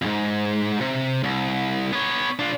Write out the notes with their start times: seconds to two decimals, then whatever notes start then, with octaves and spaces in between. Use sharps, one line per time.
0.02 F2 G#2
0.81 C3
1.23 C2
1.93 B3 C#5
2.39 D4 F4